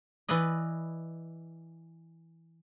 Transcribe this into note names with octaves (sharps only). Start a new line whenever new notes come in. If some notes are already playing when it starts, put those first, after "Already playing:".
E3 E4 B4 D5 D#5